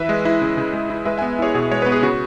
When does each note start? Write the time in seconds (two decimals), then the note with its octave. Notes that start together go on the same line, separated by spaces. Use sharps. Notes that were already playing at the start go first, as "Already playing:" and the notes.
Already playing: E3 B4 E5
0.09 G#3
0.25 E4
0.42 C#3
0.57 C#3
0.73 G#3
0.90 E4
1.05 G#3 B4 E5
1.18 B3 E5 G#5
1.39 E4 G#4 C#5
1.54 B2 G#4
1.71 G#3 C#5
1.82 B3 B4
1.92 G#4
2.02 C#3 F#4